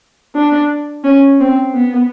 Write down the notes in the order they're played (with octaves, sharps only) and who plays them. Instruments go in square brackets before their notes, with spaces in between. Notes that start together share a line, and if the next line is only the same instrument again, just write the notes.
[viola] D4
C#4
C4
B3